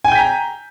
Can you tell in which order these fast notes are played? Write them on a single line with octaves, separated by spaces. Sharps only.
G#5 G5 G6 B6 A#5